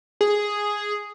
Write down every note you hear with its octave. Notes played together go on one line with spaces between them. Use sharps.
G#4